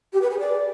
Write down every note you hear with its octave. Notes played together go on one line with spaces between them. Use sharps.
G4
B4
G#4
D5